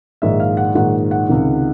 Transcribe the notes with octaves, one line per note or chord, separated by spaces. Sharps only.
A#1 G#2 D#3 E5
F5
F#5
A#1 G#2 D#3 F#5
F#5
C#2 C3 D#3